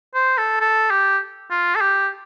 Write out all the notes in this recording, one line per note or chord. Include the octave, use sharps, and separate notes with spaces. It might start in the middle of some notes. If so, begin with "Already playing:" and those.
C5
A4
A4
G4
F4
A4
G4